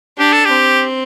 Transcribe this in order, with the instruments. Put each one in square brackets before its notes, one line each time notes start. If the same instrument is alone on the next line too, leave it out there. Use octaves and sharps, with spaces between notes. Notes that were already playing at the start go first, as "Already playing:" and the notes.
[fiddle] D4 [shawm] G4
[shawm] A4
G4
[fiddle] C4